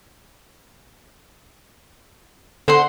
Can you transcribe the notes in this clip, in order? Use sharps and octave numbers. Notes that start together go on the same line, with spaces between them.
D3 C5 F#5 C6